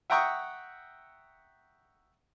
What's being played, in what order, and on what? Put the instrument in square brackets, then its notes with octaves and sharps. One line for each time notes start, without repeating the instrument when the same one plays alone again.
[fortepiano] E5 F#5 G5 A#5 C#6 D#6